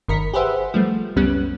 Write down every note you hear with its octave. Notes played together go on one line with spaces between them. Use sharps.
G1 D#3 A#4 B5 B6 C#7
G4 G#4 B4 C5 E5 F#5
F3 G3 A3
C#2 F#2 G3 B3 C#4 F#6